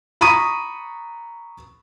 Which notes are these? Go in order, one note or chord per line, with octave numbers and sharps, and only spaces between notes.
A#5 B5 C#6 D#6 D#7